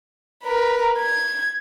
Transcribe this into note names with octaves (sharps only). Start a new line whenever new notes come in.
A#4 B4
G#6